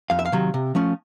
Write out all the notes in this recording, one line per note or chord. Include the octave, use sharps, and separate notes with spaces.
F2 F5
E5
F5
C3 D#3 F#3
C3
F3 A3 C#4